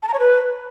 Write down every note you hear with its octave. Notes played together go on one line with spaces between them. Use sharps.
A5
A#5
C#5
B4